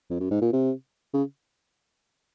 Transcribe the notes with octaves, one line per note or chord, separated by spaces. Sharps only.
F2
F#2
G#2
A#2
C3
C#3